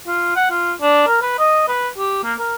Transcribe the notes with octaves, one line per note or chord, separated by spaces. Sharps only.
F4
F#5
F4
D4
A#4
B4
D#5
B4
G4
A#3
A#4